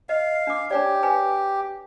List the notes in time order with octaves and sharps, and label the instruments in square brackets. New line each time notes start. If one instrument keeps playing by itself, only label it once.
[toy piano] D#5 [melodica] F5
[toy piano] D4 D6
[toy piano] D4 C#5 D5 [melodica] G4
[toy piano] B4 G#5